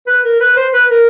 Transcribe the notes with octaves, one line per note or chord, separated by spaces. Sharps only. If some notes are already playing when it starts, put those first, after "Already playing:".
B4
A#4
B4
C5
B4
A#4